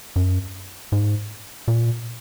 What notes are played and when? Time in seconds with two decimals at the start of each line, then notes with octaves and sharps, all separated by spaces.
0.16 F#2
0.92 G#2
1.68 A#2